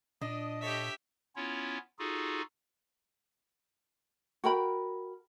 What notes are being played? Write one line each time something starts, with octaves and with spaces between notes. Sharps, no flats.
A#2 D4 D#5
G4 A4 C#5 D#5 E5
B3 C#4 E4 F4 C#5
D#4 F4 F#4 G#4 A4
F#4 A#4 G5 B5